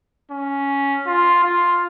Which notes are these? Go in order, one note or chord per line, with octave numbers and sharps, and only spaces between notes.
C#4
F4
F4